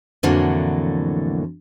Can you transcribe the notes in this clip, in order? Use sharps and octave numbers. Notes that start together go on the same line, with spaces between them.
F2 A2 D3 E3 F#3 A#3